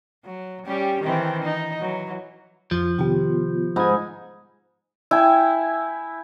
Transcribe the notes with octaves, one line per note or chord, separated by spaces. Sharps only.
F#3
G3 C#4 G4
D#3 E3 C4
D#4
E3 F#3
F2 F3 F4
C3 D#3 B3 F4 G4
G#2 D#4 D#5 B5 G#6
E4 E5 G5 G#5